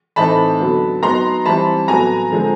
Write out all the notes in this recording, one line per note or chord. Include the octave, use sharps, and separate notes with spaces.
A2 E3 A3 C4 D#4 A5 B5
D3 F#3 B3
F#3 B3 D#4 A#5 C6
E3 G3 C4 E4 A5 B5
A2 F#3 B3 G#5 A#5
D3 F3 G#3 C4